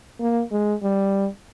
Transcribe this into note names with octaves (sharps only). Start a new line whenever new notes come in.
A#3
G#3
G3